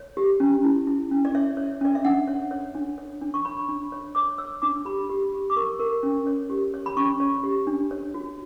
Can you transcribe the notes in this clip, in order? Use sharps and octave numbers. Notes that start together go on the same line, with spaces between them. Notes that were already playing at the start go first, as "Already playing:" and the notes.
Already playing: C#5
G4
C#4
E4
E4
C#4
D5
C#5 E5
C#5
C#4 D5
E5
D4 F#5
C#5
C#5
D4
C#5
D4
C#6
C#5 B5
D4
C#5
C#5 D6
C#5 E6
D4 D6
G4 B5
G4
G4
D6
A#4 C#6
A#4
C#4
C#5
G4
C#5
B5
C#4 C#6
C#5
G4
D4
C#5
F#4